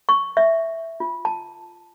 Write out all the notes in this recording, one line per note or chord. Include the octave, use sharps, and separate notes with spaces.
C#6
E5
F4
A5